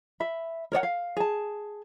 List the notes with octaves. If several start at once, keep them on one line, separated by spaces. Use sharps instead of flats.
E5 B5
A#4 C#5 D5 F#5
F5
G#4 A5